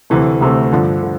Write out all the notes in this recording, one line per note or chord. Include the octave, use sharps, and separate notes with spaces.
D2 C3 E3 A3
D2 C3 E3 A3
G2 D3 F3
D3